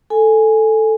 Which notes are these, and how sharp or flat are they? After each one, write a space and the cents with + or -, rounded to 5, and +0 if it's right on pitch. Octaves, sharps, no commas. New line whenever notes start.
A4 +0 G#5 +0